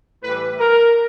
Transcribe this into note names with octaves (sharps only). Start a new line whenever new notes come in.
A2 E3 G3 B4
A#4